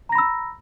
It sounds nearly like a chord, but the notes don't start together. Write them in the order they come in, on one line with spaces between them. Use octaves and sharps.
A#5 A#6 B5 E6